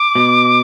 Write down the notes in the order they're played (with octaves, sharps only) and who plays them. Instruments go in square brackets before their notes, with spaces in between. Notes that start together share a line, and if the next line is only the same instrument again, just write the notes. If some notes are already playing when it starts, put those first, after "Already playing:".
Already playing: [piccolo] D6
[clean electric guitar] B2